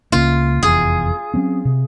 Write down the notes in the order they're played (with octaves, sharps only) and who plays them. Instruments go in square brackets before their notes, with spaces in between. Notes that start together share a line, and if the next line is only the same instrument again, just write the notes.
[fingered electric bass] C#2 C#3 A#3 [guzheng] F4
[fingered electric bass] F1 E2 [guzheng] G#4
[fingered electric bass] F#3 C4 C#4
C3